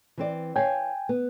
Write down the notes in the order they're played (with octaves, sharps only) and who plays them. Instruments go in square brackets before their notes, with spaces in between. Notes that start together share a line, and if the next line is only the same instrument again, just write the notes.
[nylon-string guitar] E3 C4 D5
[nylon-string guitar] C#5 F5 [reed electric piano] G5 G#5
[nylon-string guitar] B3